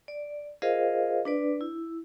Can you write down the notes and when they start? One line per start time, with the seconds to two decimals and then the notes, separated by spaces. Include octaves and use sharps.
0.08 D5
0.62 F4 G#4 A#4 C5 D#5 F5
1.25 D4 B4 D5
1.61 E4